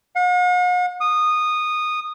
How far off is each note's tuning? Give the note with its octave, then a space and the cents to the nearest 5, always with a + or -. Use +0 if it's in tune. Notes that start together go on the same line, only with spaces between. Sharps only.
F#5 -45
D#6 -15